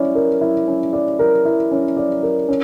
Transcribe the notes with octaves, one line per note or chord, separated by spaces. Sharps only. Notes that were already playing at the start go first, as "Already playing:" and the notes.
Already playing: C#4 E4 D5
A#4
E4
C#4
D5
A#4
E4
C#4
D5
A#4
C#4